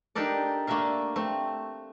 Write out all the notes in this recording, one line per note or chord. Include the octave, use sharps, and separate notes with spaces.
D4 D#4 G4 A4 A#4 D5
A3 A#3 D4 A#4 E5 F5
A3 C4